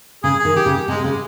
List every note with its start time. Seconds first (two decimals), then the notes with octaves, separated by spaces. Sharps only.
0.24 C#3 G#4
0.39 G#4
0.45 D#3
0.56 G4
0.66 C#3
0.88 C3 G#3
1.04 C#3 G#3